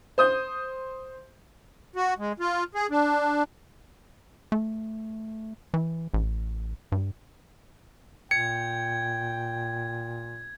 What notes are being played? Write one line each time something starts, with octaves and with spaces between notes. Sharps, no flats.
C5 D#6 G6
F#4
G#3
F4
G#4
D4
A3
E3
A1
G2
A#2 G5 G#6 C#7